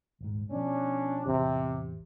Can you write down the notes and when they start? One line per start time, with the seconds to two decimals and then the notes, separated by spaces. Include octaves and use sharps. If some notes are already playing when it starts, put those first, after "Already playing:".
0.21 D#1 G#2
0.51 B2 F3 C#4 D4
1.26 A1 E2 C3